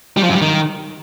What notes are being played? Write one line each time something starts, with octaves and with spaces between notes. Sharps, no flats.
G3
F3
F#2
G3
D#3